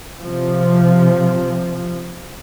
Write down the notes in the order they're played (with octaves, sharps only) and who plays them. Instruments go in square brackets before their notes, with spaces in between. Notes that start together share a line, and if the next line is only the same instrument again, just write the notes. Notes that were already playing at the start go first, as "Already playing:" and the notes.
[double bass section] C3 F3